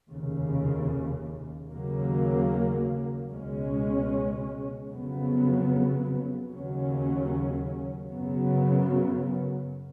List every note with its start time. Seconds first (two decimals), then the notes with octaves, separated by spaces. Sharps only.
0.10 F1 D#2 C#3
1.70 D#2 C#3 F#3 A#3
3.31 C#2 B2 G#3 C#4
4.91 F2 C#3 F#3 B3
6.51 D#2 C#3 F#3 C#4
8.11 F#2 C#3 F#3 B3